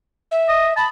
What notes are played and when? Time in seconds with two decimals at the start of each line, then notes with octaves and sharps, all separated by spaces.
0.31 E5
0.49 D#5
0.77 A5 B5